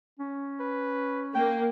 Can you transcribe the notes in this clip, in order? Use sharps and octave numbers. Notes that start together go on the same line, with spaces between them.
C#4
B4
A#3 G5